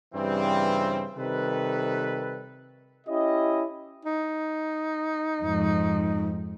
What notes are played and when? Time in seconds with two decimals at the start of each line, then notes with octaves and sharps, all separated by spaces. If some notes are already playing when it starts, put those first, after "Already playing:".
0.14 G2 C#3 E3 G3 C4
1.16 C3 D#3 G3 A4 B4
3.07 C#4 E4 G4 D#5
4.05 D#4
5.41 F2 G#2